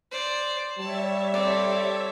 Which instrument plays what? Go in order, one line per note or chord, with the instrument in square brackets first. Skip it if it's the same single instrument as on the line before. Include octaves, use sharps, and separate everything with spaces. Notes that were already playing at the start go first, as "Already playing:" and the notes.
[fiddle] C5 D5
[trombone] G3 [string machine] C#5 E5 [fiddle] A5
[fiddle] C4 A4 [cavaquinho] D5